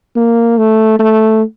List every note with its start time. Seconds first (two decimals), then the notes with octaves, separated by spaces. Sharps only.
0.16 A#3
0.58 A3
0.99 A3